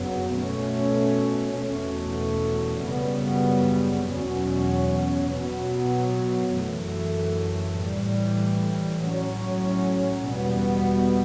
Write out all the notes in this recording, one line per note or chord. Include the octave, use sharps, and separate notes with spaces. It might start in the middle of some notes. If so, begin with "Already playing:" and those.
Already playing: F#2 C#3 F#3 B3
B2 A3 C#4
E2 B2 A3 C#4
F#2 C#3 G3 B3
E2 B2 F#3 C#4
B2 F#3 B3
F#2 E3 A3
A2 E3 G3
A2 F#3 C#4
E2 B2 G3 B3